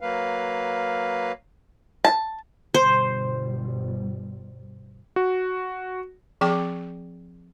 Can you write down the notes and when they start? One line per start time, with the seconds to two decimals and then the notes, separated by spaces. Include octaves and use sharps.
0.01 F#3 A#3 B4 F5
2.05 A5
2.74 G1 B2 G3 C5
5.16 F#4
6.41 F3 C4 G#4 G5 D6